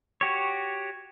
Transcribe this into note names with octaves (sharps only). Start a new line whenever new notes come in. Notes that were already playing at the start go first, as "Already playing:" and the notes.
F#4 G4 C#5